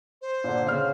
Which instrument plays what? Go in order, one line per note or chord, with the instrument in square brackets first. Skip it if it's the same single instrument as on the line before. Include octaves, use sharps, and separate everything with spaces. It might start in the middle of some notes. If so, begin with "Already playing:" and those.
[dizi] C5
[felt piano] A#2 D3
C#3 F6